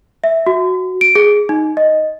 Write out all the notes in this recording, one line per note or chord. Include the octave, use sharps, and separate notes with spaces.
E5
F#4
D7
G#4
D#4
D#5